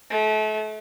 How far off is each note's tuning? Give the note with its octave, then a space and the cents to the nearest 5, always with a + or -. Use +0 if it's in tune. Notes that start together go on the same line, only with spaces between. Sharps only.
A3 -35